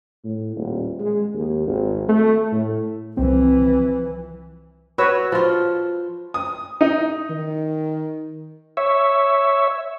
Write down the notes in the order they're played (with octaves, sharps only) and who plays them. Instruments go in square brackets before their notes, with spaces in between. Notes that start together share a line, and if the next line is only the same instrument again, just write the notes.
[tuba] A2
D#1
G#3
D#2
G#1
A3
A2
[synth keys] C2 C4 [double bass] E3 F3
[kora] F#4 [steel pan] B4 C#5 E6
[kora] F3 F4
[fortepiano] D#6
D#4
[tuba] D#3
[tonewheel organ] C#5 E5